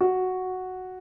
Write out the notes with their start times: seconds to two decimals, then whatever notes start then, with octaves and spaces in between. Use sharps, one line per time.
0.01 F#4